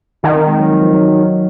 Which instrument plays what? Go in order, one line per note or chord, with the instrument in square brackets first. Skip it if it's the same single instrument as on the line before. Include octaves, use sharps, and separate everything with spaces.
[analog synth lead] D#3 [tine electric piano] D#4
[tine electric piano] C4
G#3
F#3
F3
F3
F#3